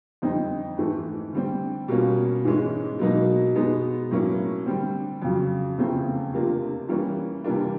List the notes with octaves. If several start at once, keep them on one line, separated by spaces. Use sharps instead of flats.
F2 D3 G3 C4 D#4
G#2 E3 A3
D3 G3 C4
B2 G3 A#3 C#4 F4
G#2 E3 G#3 C#4
B2 F#3 A#3 D#4
B2 G#3 B3 D#4
A2 F#3 A#3 C#4
D3 G3 C4
F2 C#3 F#3
E2 C#3 F3 A3 C4
C3 F3 A#3 D4 F4
E3 G3 A#3 C#4
C3 E3 G3 A#3 D4